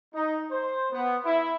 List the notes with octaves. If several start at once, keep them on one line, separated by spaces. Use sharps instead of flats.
D#4
C5
B3
E4